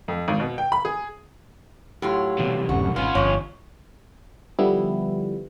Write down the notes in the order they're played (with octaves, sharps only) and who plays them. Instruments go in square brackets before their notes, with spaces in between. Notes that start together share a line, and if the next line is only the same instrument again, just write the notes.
[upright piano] F2
G#1
B2
G5
B5
G#4
[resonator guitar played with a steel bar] A2 F#3 F4 [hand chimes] G4
[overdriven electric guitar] C2 B2 [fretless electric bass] E3
[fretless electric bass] D1 A1 F#2 [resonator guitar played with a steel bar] F#4
[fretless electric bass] G#1 [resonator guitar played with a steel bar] B3 [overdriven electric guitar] C#4 F4
[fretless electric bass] G1 [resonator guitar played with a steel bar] F2 [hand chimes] C#5 C#6
[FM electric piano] D3 F3 G3 B3 E4